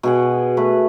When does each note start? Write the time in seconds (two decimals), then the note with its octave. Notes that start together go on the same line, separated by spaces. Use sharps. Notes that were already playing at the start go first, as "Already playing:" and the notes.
0.03 B2 G#4 F#5
0.57 A3 B4